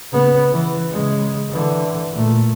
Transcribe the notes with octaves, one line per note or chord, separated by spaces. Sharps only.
C#3 B3
E3
C#3 G#3
D3 E3
A#2 A3